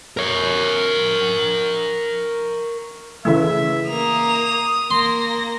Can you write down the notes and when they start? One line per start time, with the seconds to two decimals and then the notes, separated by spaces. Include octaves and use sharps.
0.17 A#4 C#5
3.25 C#3 E3 A3 E5
3.86 A#3 D#6 F7
4.91 A#3 C6 A#6